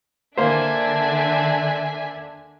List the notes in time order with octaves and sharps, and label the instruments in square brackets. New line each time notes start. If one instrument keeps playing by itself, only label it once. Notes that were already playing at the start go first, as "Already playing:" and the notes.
[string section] D3 D4 [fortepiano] A#3 C5 [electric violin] E5 G#5